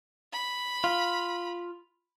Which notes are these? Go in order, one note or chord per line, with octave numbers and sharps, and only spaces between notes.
B5
F4